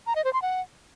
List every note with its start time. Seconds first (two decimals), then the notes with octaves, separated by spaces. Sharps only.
0.07 A#5
0.16 D#5
0.24 C5
0.33 C6
0.42 F#5